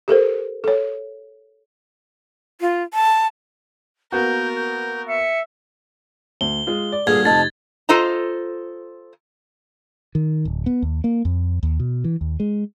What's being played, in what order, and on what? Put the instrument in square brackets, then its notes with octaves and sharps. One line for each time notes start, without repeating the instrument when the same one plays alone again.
[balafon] G4 A4 A#4 C5
A4 C#5
[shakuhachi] F4
A5
[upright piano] A#3 B3 F#4 [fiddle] A#4 [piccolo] G6
[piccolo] G6
[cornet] E5 [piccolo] C#7
[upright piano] D2 [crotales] G7
[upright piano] G#3 F4
D5
[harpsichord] G2 A#2 D3 [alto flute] G#4 [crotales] G#6
[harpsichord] F2 C3 [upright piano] A3 D#4 [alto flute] A5 [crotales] A6
[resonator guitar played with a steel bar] F4 A4 C5 D#5 A#5
[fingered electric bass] D#3
D1
B3
D#2
A#3
F2
D#2
B2
E3
D#2
G#3